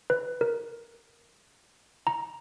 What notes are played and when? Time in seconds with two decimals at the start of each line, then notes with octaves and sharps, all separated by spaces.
0.10 B4
0.41 A#4
2.07 A#5